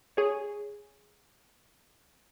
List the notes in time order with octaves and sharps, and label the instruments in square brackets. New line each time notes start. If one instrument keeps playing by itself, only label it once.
[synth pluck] G#4 C#5